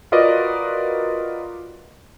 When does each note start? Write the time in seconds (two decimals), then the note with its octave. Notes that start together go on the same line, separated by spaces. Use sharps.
0.12 F4 F#4 A#4 B4 D5 D#5